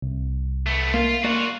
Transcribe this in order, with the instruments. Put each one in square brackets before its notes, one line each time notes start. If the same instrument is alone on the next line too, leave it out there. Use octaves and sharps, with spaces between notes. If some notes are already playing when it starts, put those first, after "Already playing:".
[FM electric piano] C2
[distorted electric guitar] A3 B3
[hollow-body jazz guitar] A#3 [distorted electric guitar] F4
[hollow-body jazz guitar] A#3 D5 [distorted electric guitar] F4 F#4